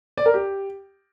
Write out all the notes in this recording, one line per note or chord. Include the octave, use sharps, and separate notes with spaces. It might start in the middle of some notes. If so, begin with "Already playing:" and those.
D5
A#4
G4